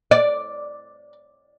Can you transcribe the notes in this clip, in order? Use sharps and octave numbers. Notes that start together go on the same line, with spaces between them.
D5